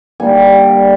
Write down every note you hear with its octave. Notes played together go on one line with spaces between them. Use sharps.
D3 G3 A#3 G#5